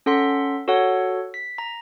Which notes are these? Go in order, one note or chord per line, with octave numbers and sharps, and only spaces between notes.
C#4 A4 F#5 C6 B6
F#4 A4 C#5 F#5
B6
A#5